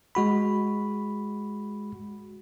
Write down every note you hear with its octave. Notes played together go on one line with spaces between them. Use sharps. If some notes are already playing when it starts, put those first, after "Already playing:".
G#3 F#4 B5